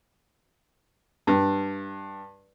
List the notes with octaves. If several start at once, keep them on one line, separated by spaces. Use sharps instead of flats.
G2